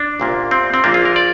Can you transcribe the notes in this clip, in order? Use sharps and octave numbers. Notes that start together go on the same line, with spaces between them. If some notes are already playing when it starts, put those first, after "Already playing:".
Already playing: D4
C2 A#2 A#3
C4
C4
A#1 A#2 A#3 D4
F4
A#4
D5